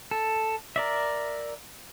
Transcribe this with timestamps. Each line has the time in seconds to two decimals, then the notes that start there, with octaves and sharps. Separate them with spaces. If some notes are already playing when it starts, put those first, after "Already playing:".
0.11 A4
0.76 A#4 D5 E5